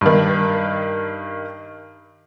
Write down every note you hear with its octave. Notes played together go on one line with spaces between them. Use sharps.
G2 D#3